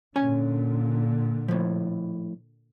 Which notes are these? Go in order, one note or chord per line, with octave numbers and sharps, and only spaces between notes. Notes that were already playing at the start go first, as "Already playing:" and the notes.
A#2 D3 C#4 G#5
A2 F3